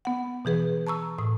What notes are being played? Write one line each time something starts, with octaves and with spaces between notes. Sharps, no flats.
B3 F#5
B2 E3 G#4 B4
A5 A#5 C#6 E6
A2 D#6